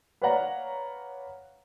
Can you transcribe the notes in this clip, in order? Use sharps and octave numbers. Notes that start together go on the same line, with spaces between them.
B4 C#5 D5 F5 F#5 A#5